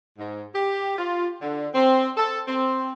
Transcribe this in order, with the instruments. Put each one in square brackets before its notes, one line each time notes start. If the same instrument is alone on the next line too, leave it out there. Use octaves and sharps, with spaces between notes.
[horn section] G#2
G4
F4
D3
C4
A4
C4